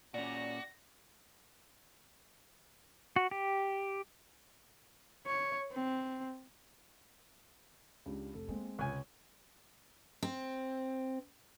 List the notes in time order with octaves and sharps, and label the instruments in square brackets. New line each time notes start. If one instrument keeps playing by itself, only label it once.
[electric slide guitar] A#2 C#4 [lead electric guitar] F#4 [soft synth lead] D5 [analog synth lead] A#6
[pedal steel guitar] F#4
G4
[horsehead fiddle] C#5
C4
[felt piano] C#2 D4 G4
F1 A4
[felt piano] G#3 C4 [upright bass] A#3
[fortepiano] C#2 G#5 [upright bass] C3 [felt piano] C#6
[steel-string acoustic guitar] C4